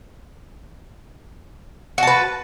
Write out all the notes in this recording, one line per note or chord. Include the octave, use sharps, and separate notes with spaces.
F#4 B4 A5